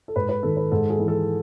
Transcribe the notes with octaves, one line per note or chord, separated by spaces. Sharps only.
A4
G#2 B4
B4
D#3 A4
B4
G#2 A4
G#4
E3
A4